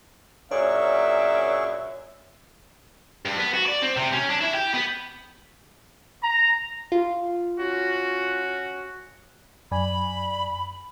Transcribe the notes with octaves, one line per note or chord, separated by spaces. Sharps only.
F#2 A#2 D4 G#4 C#5 E5 C#6
G2
B3
F#4
D5
C4
C3
C#4
D4
E4
G4
B3
A#5
F4
C#4 F#4
F#2 D5 G#5 B5